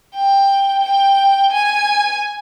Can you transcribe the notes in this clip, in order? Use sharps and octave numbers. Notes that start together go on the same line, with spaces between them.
G5
G5
G#5